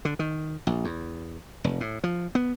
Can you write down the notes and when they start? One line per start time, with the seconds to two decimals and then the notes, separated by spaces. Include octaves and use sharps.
0.05 D3
0.19 D#3
0.67 A#1
0.84 E2
1.64 F1
1.81 A2
2.04 F3
2.35 B3